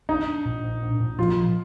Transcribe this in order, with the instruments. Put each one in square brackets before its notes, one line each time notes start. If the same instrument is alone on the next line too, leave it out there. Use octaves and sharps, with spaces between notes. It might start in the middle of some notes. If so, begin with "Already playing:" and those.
[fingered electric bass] D4 [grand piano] D#4
[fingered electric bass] D4
A#2
D4
D4
A#2
[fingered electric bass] F3 [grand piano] F4
[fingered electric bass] F3